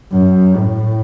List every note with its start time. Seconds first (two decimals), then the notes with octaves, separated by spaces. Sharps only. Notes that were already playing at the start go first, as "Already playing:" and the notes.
0.12 F#2
0.55 A2